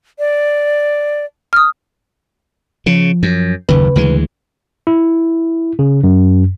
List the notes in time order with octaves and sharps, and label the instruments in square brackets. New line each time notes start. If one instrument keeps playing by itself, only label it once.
[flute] D5
[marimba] D#6 F6
[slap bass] C#3 [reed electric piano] F3
[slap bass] F#2
[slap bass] F#1 D#2 [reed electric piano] C#3 B4
[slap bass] D2 E3 G#3
[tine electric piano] E4
C#3
F#2